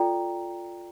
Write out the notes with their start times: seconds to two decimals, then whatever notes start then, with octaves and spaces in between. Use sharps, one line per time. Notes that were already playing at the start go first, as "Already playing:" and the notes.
Already playing: F4 A4 D5 G5 A#5